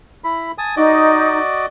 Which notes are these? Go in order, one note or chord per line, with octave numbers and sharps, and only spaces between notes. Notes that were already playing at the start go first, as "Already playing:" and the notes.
E4 B5
G#5 A5 D#6
D#4 F#4 D5 D#5